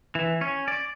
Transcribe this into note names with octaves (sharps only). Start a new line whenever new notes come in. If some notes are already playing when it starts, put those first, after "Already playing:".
E3
C#4
D5